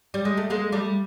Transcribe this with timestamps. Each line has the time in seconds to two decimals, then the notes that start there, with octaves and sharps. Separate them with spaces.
0.14 G3
0.25 G#3
0.37 A3
0.50 G#3 A#3
0.72 G3 A3